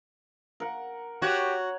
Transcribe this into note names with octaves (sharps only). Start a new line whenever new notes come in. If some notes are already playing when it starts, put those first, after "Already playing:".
A#4 F#5
F#4 G4 C#5